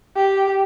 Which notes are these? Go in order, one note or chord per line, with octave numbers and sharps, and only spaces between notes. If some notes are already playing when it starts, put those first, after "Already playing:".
G4